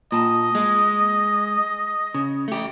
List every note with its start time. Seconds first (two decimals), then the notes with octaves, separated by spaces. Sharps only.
0.12 A#2 D#5 A5
0.55 G#3
2.14 C#3
2.48 A3 G4